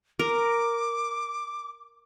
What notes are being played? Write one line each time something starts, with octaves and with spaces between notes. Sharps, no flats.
A#4 D6